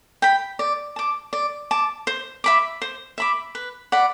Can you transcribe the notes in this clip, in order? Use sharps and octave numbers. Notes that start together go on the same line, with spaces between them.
G5 B5
D5
A5 D6
D5
A5 D6
C5
E5 B5 D6
C5
E5 B5 D6
B4
D5 F#5 B5